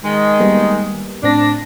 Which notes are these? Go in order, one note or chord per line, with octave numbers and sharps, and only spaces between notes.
D#3 G#3
G3 A#3 B3
A2 C4 D4 A#6